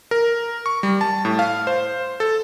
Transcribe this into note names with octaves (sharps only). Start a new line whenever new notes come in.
A#4
C#6
G3
A5
A2
F5
C5
A4